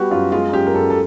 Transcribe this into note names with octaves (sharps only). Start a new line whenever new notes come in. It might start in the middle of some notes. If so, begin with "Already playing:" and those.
Already playing: G3 B3 F#4 G4
F#2 F4
G#3 F4
F#2 G4
A#4
F#2 A4
A4